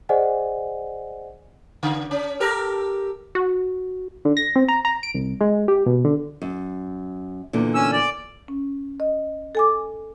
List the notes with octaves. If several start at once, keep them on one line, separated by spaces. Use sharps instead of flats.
G#4 C5 D5 D#5 F#5 G#5
C#3
C#4
G4 A4 A#4
F#4
D3
A#6
C4
A#5
A#5
D7
C2
G#3
G4
B2
D3
F#2
E2 A#2 D3
C#4 E6
D5
C#4
D#5
A4 G#5 D6